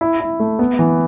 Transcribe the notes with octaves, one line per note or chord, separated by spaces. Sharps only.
E4
E4
A3
B3
E3